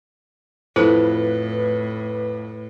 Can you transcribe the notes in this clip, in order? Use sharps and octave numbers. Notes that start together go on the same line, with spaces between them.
F2 A2 E4 A4 B4